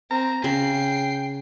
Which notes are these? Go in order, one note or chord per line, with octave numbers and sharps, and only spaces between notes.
C4 A#5
C#3 G5 C7